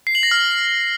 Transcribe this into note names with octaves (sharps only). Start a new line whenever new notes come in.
C7
F#7
A#6
F6